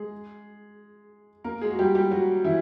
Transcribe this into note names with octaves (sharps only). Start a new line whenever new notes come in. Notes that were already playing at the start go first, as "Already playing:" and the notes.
Already playing: G#3 G#4
A#3 A#4
G#3 G#4
F#4
G3 G4
G3 G4
F#3 F#4
E3 E4